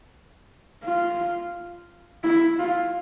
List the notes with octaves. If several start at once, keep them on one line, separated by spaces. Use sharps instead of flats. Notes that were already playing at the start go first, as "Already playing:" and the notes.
F4
E4
F4